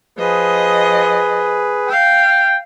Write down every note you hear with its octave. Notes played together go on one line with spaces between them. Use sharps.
F3 G#4 B4 D#5
F5 G5